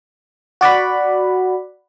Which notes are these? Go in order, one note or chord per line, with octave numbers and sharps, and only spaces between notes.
F#4 D5 F#5 B5